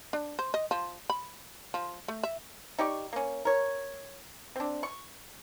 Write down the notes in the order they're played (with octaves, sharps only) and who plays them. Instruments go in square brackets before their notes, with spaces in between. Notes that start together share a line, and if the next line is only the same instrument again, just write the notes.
[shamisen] D4
C5
D#5
F3
B5
F3
A3
E5
[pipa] D#4 G4 D5 C#6
A#3 C#4
A#4 C#5
C4 D4
C#6